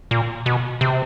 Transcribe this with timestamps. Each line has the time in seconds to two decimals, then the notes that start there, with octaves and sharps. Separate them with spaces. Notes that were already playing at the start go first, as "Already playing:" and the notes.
0.11 A#2
0.46 B2
0.81 C3